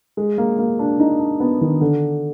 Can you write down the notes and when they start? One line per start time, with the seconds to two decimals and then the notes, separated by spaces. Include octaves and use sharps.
0.17 G#3
0.38 A#3
0.58 A#3
0.79 D4
0.99 D#4
1.20 D4
1.40 B3
1.61 D#3
1.81 D3